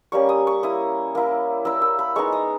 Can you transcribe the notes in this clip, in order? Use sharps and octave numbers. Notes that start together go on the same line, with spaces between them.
G3 A#3 C#4 C#6
D#6
C#6
A#3 E4 D#6
A#3 E4
A#3 E4 E6
E6
B5
G#3 B3 D#4 C#6
D#6